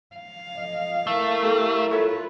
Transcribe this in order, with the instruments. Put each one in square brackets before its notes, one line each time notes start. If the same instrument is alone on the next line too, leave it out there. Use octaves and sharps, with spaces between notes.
[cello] F5
[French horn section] F2 F3 D#5
[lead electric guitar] A3 [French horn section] E4 A#4
[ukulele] G4 A4
[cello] F4 B4 [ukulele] A4 C#5 E5